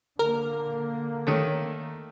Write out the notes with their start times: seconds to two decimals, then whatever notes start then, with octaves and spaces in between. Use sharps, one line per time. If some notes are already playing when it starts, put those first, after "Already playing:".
0.19 D3 A#3 A#4
1.27 D#3 A3 A4 C#5 D#5